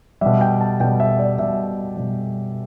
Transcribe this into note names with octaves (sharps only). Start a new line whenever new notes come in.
B2 G3 E5
G5
A5
B2 G3 G5
E5
D5
B2 G3 E5
B2 G3